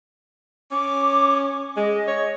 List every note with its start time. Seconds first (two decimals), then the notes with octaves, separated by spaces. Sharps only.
0.72 C#4 D6
1.77 G#3 D#5
2.08 C#5